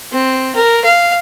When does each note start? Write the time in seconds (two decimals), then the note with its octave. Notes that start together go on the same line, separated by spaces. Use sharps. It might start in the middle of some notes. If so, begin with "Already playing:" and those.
0.13 C4
0.56 A#4
0.85 F5